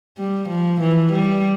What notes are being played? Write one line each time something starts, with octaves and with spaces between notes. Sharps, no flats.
G3
F3
E3
G3